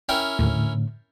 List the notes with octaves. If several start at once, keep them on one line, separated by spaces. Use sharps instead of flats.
C#4 E4 A#4 G5
D#2 A2 D3